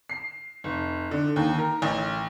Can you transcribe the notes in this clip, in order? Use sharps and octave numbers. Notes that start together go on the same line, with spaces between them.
C7
F1
D3
D#2
A#4
A1